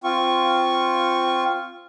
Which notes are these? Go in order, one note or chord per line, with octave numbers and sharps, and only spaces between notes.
C4 F4 C#6